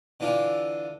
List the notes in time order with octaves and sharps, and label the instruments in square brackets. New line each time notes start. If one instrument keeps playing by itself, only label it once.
[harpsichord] D3 E3 D4 F4 A4